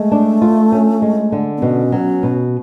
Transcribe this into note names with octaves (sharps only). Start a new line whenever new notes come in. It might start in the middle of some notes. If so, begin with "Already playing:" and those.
Already playing: G#3 A3
D4
F4
C#4
G#3
D3
B3
B2 C#4
F#3
B2